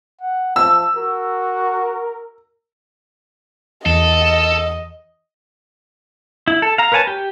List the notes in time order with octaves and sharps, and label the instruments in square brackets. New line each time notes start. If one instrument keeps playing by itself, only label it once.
[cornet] F#5
[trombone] F3 [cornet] A5 [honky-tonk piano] E6
[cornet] F#4 [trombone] A#4
[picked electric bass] E2 [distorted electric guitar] A4 [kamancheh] D#5
[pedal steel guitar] E4
A4
F5 A#5
A#4 B4 C#5 G#5 A5
G4